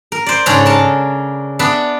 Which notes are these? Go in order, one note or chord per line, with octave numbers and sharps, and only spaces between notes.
A#4
C5 D5
G#2 C#3 C#4 D4 A4 A#5
A#4 A5
B3 D4 E5